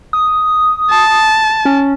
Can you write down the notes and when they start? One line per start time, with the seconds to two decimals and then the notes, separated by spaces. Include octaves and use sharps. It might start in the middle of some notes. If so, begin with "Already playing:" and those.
0.13 D#6
0.90 A5
1.65 C#4